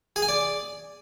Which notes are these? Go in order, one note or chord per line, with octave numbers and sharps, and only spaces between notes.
G#4
G#5
D5